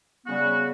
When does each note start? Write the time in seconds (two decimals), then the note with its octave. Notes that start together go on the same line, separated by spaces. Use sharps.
0.26 C#3 G3 B3 F#4